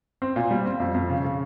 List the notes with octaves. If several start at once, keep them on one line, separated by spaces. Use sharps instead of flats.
C4
A#2
G3
C4
F2
F2
C#3
C#3